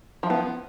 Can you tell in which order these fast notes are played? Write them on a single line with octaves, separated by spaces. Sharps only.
F3 E4 B3